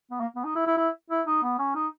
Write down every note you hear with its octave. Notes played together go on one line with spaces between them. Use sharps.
B3
A#3
B3
D#4
E4
E4
E4
E4
D#4
B3
C#4
D#4